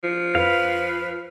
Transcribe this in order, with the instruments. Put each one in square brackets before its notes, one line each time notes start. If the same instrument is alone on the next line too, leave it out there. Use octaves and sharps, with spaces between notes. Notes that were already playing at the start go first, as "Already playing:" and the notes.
[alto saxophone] F3
[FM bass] F2 [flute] B4 [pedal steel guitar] F5